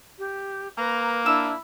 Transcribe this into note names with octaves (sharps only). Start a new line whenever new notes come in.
G4
A#3 B4 A#5
D4 E4 E6